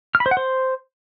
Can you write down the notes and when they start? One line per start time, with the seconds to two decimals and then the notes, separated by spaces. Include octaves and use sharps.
0.15 F6
0.20 B5
0.26 C5
0.31 F#5
0.37 C5